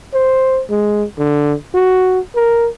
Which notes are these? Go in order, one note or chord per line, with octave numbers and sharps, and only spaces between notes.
C5
G#3
D3
F#4
A#4